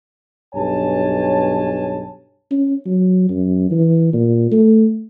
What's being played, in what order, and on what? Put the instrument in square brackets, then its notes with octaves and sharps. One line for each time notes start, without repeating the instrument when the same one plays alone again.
[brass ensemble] B1 G2 C#5 G#5 A5
[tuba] C#4
F#3
F#2
E3
A#2
A3